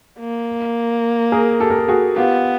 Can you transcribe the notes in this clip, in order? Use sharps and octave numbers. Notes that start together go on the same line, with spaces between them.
A#3
G#4 A#4
G4 A4
A#4
A4
F#4 G#4
B3 F4 G4